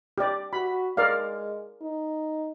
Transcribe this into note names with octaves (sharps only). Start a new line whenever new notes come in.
G4 D5
F#4 B5
G#3 A#4 D5 F5
D#4